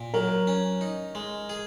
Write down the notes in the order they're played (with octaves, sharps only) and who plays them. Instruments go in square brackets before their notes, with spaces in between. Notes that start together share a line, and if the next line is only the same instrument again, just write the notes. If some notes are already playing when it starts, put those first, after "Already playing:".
Already playing: [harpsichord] A#2
[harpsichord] F#3 [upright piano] A#4
[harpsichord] C#4
D#4
G#3
G#4